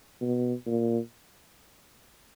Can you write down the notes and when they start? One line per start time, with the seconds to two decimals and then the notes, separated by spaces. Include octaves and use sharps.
0.21 B2
0.66 A#2